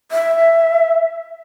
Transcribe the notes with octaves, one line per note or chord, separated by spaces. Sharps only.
E5